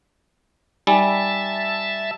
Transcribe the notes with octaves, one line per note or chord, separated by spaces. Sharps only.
G3 D#4 E5 G#5 A5